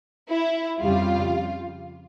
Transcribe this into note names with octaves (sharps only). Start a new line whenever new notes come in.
E4
F2 C#3 G3 F4